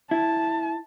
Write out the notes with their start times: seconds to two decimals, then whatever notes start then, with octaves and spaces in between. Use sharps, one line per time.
0.11 E4 A5